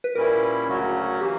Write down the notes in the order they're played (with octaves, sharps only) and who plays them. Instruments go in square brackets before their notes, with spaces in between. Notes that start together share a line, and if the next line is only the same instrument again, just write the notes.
[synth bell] B4
[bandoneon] A#2 G3 C#4 E4 [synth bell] A#4
[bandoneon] D2 C#3 F#3 C#4 F#4
[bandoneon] E3 A#3 [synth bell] G4